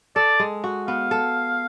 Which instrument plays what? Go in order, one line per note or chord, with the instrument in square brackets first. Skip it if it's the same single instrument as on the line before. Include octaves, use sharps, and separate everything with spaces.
[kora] A4 [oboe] D5
[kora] G#3
F#4
[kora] B3 [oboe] F5
[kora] A4